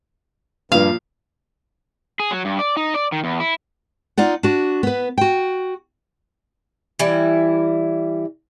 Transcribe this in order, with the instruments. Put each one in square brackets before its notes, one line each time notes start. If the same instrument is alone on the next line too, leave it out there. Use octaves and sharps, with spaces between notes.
[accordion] G2 [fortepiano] A#2 F3 [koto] F5
[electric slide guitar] G#4
F#3
G2
D5
D#4
D5
D#3
E2
E4
[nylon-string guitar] D#4 F4 D5 F#5
D4 F#4
B3 B4
F#4 G5
[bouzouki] E3 G3 E4